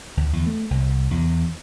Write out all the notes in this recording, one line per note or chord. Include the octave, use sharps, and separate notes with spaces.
D2
E2
A3
C2
E2